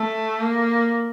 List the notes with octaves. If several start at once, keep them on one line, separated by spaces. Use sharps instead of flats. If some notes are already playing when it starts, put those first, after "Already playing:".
Already playing: A3
A#3